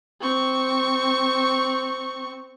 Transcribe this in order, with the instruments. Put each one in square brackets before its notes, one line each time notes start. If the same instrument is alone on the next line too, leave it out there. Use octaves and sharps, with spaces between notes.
[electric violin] C4 C#6